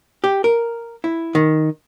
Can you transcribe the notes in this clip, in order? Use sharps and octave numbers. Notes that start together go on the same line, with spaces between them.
G4
A#4
E4
D#3